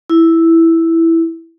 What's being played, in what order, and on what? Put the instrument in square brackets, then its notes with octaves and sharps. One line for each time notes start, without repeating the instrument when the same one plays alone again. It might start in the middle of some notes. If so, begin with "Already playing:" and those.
[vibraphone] E4